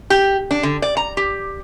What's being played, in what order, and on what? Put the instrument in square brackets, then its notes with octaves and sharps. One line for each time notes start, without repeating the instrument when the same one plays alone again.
[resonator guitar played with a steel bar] G4
D4
D3
D5
A#5
G4